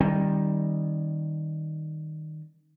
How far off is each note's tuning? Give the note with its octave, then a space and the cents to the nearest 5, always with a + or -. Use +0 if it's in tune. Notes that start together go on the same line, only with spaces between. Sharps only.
D#3 +0 G3 +0 C4 +45